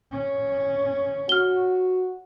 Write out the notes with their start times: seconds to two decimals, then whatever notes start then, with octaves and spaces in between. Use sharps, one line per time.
0.11 C#4
1.29 F#4 F6 G7